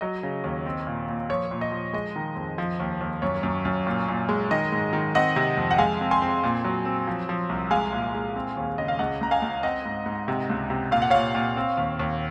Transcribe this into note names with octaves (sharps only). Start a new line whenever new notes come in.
F#3 D#5
C#3
D#2
C4
A#2
A#2
F3 C#5
A#2
D#5
F3
G#3 D#5
D#3
F2
F3
D#2
D#2
F#2 C#5
F#2
F#2
A#2
A#2
G#3
D#3 D#5
G#2
D#3
C4 D#5 F#5
C3
F2
F#5
G#3 F5 G#5
C4
G#5 C6
C4
A#2
F#3
C4
F3
F3
C2
G#3 F5 G#5
A#2
G#3
C4
D#2
C#3 D#5
F5
C#2 D#5 F#5
C#2 A#5
F5 G#5
C#2
C4 D#5 F#5
G#2
G#2
C3
C#2
C3
A#2 F5
F#5
A#2 C#5 F5
A#2
C4
D#2
D#2